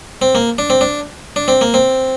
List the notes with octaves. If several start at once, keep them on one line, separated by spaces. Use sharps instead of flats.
C4
A#3
D4
C4
D4
D4
C4
A#3
C4